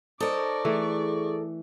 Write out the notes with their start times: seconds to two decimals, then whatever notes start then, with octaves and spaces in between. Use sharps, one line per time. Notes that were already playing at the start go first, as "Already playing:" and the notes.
0.20 D#4 A4 A#4 C5 D5 C#6
0.65 E3 A3 G#4